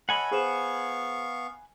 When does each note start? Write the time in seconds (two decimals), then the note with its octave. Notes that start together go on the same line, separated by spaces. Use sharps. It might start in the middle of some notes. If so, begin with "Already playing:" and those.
0.09 A4 C#5 D#5 F#5 G#5 B5
0.31 B3 G#4 C5 F5 C#6 E7